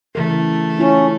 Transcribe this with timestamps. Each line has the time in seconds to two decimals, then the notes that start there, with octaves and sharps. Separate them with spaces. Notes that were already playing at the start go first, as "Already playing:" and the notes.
0.15 C#3 E3 A3 A#4
0.80 C#4 E4 F4